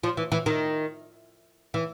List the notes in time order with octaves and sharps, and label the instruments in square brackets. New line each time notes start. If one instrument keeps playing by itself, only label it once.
[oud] F3
E3
E3
D#3
E3